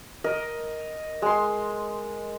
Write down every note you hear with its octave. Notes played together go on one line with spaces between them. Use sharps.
A#4 D#5
G#3 C6